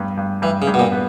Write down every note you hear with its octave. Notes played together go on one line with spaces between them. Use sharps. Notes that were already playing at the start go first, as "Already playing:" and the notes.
Already playing: G2 B3
G2
G2 E3
C#3
G2
B2
A#2
B3